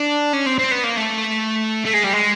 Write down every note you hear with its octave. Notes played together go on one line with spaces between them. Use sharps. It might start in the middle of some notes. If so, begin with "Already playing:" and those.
Already playing: D4
C#4
C4
C4
B3
A#3
A3
A3
G#3
G3
G#3